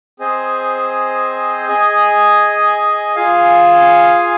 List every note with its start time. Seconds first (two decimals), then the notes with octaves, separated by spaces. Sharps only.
0.19 C4 G#4 C5 D#5 G#5
1.68 G#4 D#5 G#5
3.16 F4 G#4 F5 G#5